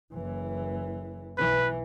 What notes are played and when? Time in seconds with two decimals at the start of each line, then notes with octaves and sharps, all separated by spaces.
0.12 F#1 E3
1.38 B1 E3 B4